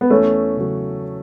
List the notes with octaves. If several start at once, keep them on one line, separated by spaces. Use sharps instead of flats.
B3
E2 A3 C#4
C#3 F#3